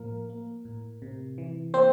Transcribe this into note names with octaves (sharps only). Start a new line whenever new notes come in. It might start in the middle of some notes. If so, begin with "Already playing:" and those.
Already playing: A2 F3 A#3 A#4
A#3
A2
C3
E3
A#3 C4 C5